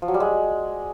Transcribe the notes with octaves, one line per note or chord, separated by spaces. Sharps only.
F3
F#3
G3
G#3